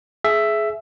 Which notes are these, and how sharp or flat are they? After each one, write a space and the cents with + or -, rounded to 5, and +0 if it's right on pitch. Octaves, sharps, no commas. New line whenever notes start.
G#4 +25 E5 +10